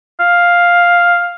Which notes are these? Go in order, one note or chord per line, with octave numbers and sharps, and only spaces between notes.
F5